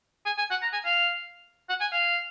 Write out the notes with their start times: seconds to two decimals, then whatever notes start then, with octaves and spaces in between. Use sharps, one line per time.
0.26 G#5
0.38 G#5
0.50 F#5
0.62 A#5
0.73 G#5
0.85 F5
1.69 F#5
1.81 G#5
1.92 F5